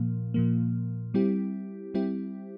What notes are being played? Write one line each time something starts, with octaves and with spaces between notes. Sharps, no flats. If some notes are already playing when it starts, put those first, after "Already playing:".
Already playing: A#2 F3 A#3
A#2 F3 A#3
G3 C4 E4 G4
G3 C4 E4 G4